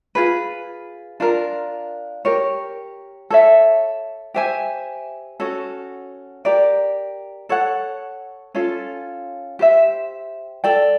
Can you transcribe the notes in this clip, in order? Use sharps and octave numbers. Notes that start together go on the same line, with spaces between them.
F4 G#4 B4
D4 F4 A#4
G4 A#4 C#5
A4 C#5 E5
G4 C5 E5 G#5
C#4 F#4 A4
G4 A#4 D5
A4 C#5 F#5
C#4 F4 A4
G4 C5 E5
A4 D5 G5